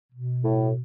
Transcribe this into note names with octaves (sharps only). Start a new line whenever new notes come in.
B2
A2